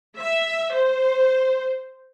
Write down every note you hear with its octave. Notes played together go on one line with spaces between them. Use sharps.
E5
C5